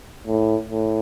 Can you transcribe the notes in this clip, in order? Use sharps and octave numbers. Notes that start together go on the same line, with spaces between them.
A2
A2